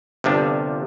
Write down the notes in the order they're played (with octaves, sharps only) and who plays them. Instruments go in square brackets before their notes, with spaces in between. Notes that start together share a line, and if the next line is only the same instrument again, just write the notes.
[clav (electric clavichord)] G1 C3 F3 D4